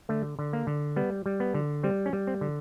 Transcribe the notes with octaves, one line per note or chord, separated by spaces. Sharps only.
D3 A3
D3
A#3
D3
G3 B3
G3
B3
D3
G3 C4
C#4
G3
C4
D3